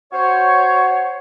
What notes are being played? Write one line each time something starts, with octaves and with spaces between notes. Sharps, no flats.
F#4 C5 C#5